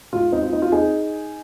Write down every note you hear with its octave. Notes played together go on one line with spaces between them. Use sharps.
G#2 F4
C4 D#4
F4
C4 D#4
F4
C4 D#4 G#4